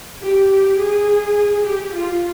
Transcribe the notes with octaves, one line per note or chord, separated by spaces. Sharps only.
G4
G4
G#4
G4
F4